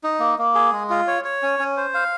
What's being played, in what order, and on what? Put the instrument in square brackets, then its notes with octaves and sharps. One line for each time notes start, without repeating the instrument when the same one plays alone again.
[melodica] D#4
A#3
A#3
G#4
G#3
F4
C#5
C#5
C#4
C#4
C5
F5